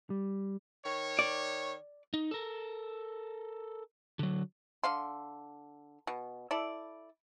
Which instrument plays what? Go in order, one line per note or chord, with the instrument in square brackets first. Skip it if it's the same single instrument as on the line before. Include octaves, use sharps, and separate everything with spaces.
[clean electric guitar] G3
[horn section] D#3 C#5
[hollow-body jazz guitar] D5
[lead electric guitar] D#4
A4 A#4
D3 F#3
[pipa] D3 F5 C6
B2
E4 A4 D5